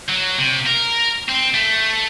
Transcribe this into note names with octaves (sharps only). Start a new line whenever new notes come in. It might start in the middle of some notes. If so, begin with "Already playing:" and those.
F#3
C3
A#4
C4
A3